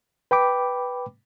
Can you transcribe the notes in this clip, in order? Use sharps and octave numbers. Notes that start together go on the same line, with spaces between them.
B4 G5 B5 D6